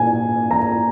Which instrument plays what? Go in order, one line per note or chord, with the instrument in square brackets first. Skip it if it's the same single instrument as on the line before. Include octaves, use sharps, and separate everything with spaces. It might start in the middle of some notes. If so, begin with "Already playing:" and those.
Already playing: [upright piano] A#2 G#5
A#5